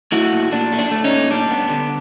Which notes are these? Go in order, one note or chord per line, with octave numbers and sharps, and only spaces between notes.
A3 E4 F#4
A#2
A#2 D4
A3
D4
A3
C#4 D#4
A#2
G3 D4
B3
D3